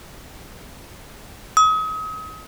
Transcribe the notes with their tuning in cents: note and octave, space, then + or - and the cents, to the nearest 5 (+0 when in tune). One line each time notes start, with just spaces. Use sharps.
D#6 +35